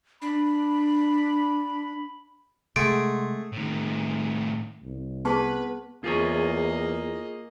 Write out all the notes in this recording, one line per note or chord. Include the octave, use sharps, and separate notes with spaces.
D4 B5
C3 G#3 A3 G#4 F#5 C6 D7
A2 D#3
C2
B3 G#4 B4 A5
E2 A#3 F4 G#4 C#5 D#5